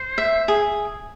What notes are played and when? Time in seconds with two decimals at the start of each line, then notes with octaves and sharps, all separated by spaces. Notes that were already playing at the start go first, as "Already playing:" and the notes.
Already playing: C5
0.18 E5
0.48 G#4